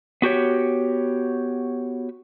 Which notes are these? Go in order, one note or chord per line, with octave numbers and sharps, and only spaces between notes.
B3 F#4 G4 C#5